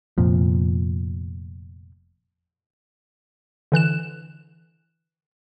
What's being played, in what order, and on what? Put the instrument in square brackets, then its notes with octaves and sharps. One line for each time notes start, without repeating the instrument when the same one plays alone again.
[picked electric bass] F1 F2 A#2 F3
[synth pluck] D3 E3 F#6 E7